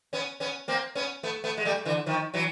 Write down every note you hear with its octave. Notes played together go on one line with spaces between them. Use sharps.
B3 C#4
B3 C#4
A#3 C4
B3 C#4
A3 B3
A3 B3
G#3
G3 A3
D3 E3
D#3 F3
E3 F#3